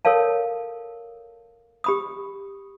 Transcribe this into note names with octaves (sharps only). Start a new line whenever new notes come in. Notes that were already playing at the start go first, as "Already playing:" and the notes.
A4 A#4 C#5 F5 A5
G4 B5 D#6